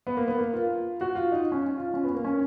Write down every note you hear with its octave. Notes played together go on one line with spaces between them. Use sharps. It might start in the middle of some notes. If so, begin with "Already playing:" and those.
B3
A#3
B3
A#3
F4
F#4
F4
D#4
C#4
F4
C#4
B3
A#3
C#4